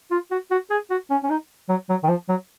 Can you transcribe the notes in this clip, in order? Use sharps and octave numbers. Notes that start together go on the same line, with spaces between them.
F4
F#4
F#4
G#4
F#4
C#4
C#4
D#4
F#3
F#3
D#3
F3
F#3